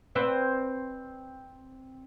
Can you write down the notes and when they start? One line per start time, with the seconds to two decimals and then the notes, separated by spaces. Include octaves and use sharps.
0.15 C4 B4 D5